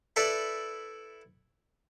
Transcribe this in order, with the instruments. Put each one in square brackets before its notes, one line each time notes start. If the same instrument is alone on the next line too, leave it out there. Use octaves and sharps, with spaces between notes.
[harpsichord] E4 A4 B4 D5